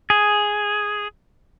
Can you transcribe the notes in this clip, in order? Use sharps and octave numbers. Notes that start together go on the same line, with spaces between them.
G#4